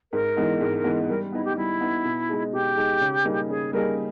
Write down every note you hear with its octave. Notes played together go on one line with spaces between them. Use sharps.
G#2 A#4
E3 G#3 B3 D#4
G#2
E3 G#3 B3 D#4
G3 A#4
B3 D#4 E4
G4
G3 E4
B3 D#4
B2
G#3 D#4 G#4
B2 G4
G#3 D#4 G#4
C#3
G3 A#3 D#4 G#4
C#3 G#4
G3 A#3 D#4 G#4 A#4